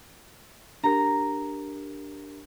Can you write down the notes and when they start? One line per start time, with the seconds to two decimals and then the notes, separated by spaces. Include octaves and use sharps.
0.84 D4 G4 A#4 A#5